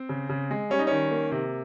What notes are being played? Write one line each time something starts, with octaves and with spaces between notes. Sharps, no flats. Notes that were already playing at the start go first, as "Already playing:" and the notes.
Already playing: C4
C#3
C#3
G#3
G3 C#4
D#4
D#3 C#4
A#3
C3